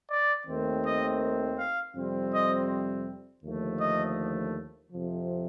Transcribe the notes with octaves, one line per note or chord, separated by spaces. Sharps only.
D5
D#2 D#3 A3 C4
D#5
F5
F2 C3 G3 C4
D#5
D#2 D3 F3 A3
D#5
F2 C3 F3